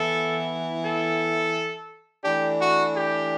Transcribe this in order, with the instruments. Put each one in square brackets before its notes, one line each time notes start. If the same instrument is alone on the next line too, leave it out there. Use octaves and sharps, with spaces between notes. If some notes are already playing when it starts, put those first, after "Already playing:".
Already playing: [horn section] E3 B3 E4 A4
A4
E3 A3 D4 G4
F#4
G4